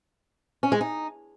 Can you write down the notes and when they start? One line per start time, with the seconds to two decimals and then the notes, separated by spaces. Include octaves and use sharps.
0.63 C#4
0.72 G#3
0.81 D#4